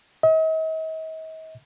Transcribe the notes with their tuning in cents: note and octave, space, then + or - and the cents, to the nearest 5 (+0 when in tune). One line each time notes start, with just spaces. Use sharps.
D#5 +45